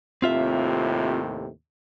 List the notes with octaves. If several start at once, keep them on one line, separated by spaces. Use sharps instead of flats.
D#2 A2 C3 C4 F4 E5